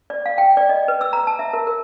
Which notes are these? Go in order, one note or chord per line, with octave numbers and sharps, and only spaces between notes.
D5
F5
G5
D5
D#5
B4
E6
A#5
A5
E5
A#4
A#4